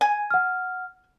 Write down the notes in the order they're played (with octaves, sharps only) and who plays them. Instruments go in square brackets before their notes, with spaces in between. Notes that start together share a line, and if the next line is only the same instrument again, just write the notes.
[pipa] G#5
[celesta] F#5 F6